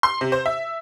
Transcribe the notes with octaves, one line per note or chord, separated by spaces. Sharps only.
C6
C3
C5
E5